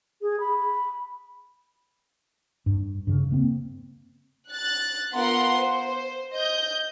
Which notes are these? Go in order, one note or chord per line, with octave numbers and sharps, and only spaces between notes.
G#4
B5
G2
G2 C#3
C#3 A#3 C4
F#6 A6
B3 F4 A#4 F#5 C6
C5
D#5 G6